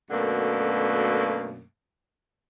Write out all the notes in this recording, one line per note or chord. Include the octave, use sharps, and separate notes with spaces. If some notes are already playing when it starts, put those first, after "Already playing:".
F#2 B2 D3 A3 A#3